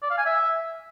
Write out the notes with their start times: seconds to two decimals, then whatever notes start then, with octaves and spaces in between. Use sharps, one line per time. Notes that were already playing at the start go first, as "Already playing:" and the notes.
0.02 D5
0.10 F5
0.18 G#5
0.26 E5